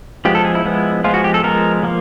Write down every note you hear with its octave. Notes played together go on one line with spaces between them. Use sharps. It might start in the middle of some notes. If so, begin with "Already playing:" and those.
F3 G#3 B3 G4
A4
G#4
E4
F3 G#3 B3
F3 G#3 B3 F4
F#4
G4
A4
F3 G#3 B3 A#4
F3 A#3